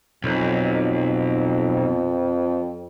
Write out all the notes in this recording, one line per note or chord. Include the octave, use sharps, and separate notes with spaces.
B1 F2